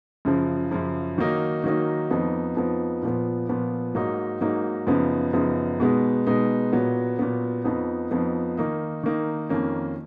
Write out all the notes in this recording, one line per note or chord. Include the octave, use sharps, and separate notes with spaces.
F#2 C#3 F3
F#2 C#3 F3
D#3 F#3 A#3 D#4
D#3 F#3 A#3 D#4
F2 F3 B3 D#4
F2 F3 B3 D#4
A#2 F3 B3
A#2 F3 B3
G#2 F#3 A#3 D#4
G#2 F#3 A#3 D#4
F#2 C#3 F3 B3 D#4
F#2 C#3 F3 B3 D#4
B2 G#3 B3 D#4
B2 G#3 B3 D#4
A#2 F#3 B3
A#2 F#3 B3
F2 F3 B3 D#4
F2 F3 B3 D#4
D#3 A#3 D#4
D#3 A#3 D#4
F2 D#3 A#3 C#4